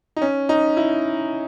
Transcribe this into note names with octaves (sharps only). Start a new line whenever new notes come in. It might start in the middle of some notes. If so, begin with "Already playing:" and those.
D#4
C#4
D#4
E4